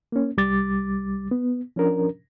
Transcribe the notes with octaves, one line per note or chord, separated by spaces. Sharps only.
A#3 C#4
C2 G3 D6 A6
B3
F3 C#4 D4 A#4